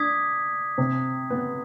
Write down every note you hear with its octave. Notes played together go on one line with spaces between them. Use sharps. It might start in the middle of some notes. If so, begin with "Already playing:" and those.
Already playing: D4 D#6 G#6 B6
C3 C4
B3